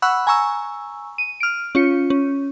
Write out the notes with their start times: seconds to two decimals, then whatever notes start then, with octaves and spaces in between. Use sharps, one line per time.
0.02 F#5 B5 C#6 E6 F#6
0.27 G#5 A#5 C#6 E6
1.18 D#7
1.40 F6 D7
1.75 C#4 F4 C#7
2.10 C#4